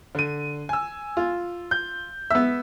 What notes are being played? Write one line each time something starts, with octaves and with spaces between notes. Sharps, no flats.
D3 D#7
G#5 E6
F4
G6
B3 E5 E6